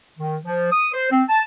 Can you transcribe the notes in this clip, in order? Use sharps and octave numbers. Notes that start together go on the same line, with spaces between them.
D#3
F3
D#6
C5
C4
A5